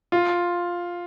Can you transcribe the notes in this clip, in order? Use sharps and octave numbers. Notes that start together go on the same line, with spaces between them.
F4